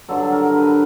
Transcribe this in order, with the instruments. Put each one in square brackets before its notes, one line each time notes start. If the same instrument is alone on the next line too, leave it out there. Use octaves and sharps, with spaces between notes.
[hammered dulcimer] G2 D3 F#3 A4
A#4
B4